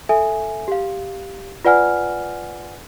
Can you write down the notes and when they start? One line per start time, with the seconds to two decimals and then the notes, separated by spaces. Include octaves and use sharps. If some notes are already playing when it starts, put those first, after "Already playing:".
0.09 A4 E5 G#5
0.68 G4 F5
1.65 F4 B4 D5 F#5 G#5 F6